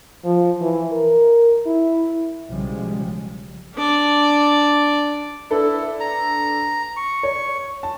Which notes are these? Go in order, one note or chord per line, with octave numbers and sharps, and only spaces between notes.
F3
E3
A#4
E4
B1 C#3 F3 G3 G#3
D4 D5
D4 E4 A4 B4
A#5
C#6
C#5
A5